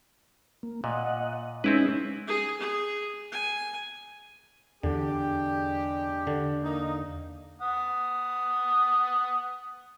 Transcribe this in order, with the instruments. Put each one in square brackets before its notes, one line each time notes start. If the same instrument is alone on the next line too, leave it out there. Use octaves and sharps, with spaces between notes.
[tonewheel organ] A#3
[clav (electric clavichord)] A#2 [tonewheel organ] D#5 F#5
[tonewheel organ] G#3 C#4 D#4 [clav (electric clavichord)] C4 E4 B4
[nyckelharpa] G#4
G#4
G#5
[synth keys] E2 [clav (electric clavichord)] D3 [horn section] G#3 D4 G4
[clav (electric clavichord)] D3
[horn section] A#3 D#4
[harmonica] F#5 D#6